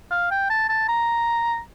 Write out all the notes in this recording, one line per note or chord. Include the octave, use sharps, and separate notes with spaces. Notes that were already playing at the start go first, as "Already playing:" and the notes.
F5
G5
A5
A5
A#5